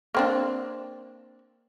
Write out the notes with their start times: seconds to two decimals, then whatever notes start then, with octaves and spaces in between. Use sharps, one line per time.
0.14 A#3 C4 D4